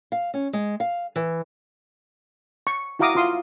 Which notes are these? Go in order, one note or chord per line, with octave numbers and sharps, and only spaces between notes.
F5
C#4
G#3
F5
E3
C#6
E4 F#4 F5 A#5 D6 D#6
F4 F5 C6 D#6